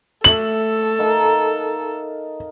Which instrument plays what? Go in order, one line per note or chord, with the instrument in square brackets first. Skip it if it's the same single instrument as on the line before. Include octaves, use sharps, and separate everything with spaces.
[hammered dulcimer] A3 E5 [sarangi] A4 [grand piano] F#7
[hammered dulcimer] D#4 A#4 F5